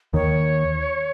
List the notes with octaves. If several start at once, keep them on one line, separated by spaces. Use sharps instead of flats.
D#2 D#3 C#5